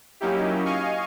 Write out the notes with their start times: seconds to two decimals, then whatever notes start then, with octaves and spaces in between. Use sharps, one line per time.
0.20 F#3 A#3 C#4 D#4 E4 G4
0.65 D#5 F5 G#5 C#6